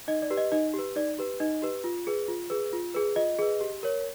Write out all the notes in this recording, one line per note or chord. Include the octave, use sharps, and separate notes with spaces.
D#4 D#5
D5
G4 B4
D#5
D#4 D#5
G4
B4
D#4 D5
G4 B4
D#4 D#5
G4 B4
F4
G#4 B4
F4
G#4 B4
F4
G#4 B4
F4 D#5
G#4 B4
G4
A#4 C#5